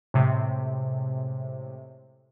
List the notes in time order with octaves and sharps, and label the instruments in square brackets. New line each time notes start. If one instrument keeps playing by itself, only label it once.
[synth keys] A2 C3 G#3